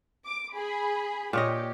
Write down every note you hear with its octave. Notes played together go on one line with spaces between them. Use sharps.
D6
G#4 B5
A#2 G4 C#5 D#5